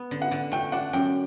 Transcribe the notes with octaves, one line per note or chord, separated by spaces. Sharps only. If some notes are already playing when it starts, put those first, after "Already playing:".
Already playing: B3
D3
F#5
D3
A3 G5
D4 F#5
F#2 G5